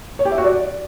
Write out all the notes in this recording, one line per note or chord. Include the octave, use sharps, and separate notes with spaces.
C#5
G4
E5
F#4
D5